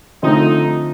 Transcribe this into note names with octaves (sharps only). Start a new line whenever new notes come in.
D3 F3 A3 C4 D#4